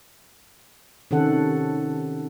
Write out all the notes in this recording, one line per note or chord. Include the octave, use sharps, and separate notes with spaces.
C3 D#3 C#4 A4 F#5